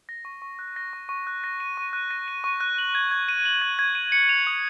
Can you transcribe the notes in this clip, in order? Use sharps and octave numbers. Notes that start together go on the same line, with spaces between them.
A#6
C#6
C#6
F#6
A#6
C#6
C#6
F#6
A#6
D#7
C#6
F#6
A#6
D#7
C#6
F#6
F#7
G#6
G#6
D#7
F#7
G#6
G#6
D#7
C#7
F7
D#6